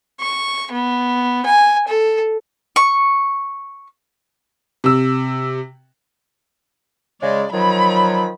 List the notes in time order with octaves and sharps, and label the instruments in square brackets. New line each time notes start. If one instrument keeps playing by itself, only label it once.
[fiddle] C#6
B3
G#5
A4
[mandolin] C#6
[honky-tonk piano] C3 E6
[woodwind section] C#3 G#3 [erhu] D5
[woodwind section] D#3 F3 F#3 [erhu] B5